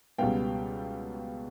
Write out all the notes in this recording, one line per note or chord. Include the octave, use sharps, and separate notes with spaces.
C#2 B2 G3 B3 F5 G5